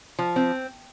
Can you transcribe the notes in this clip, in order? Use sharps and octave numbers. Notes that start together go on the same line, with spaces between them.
F3
C4